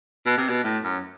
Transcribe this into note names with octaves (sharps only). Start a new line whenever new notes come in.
B2
C3
B2
A2
F#2